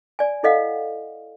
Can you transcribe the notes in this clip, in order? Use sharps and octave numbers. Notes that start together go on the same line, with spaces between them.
D5 G#5
E4 A4 D#5 F5 F#5